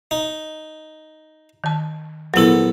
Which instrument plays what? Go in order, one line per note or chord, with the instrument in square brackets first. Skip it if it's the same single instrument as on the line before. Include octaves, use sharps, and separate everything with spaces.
[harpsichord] D#4
[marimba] D#3 A5
[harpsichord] A#1 B3 A4 [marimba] F#3 E4